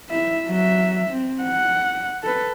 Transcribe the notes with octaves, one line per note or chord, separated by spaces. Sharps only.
E4 E5
F#3 E5
C4
F#5
A4 B4